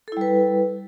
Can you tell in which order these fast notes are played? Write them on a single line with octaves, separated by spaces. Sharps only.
A4 E4 G3 B4